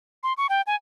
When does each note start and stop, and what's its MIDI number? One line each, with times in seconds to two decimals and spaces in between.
0.23 0.33 84
0.38 0.47 85
0.49 0.62 79
0.67 0.76 80